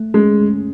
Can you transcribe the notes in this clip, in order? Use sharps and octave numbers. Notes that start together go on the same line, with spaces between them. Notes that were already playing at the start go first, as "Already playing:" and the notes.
Already playing: A3
G#3 C#4